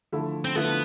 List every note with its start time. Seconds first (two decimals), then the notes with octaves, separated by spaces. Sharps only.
0.12 D3 F3 A3 E4
0.45 C4
0.55 D3 F3 A3 B3 E4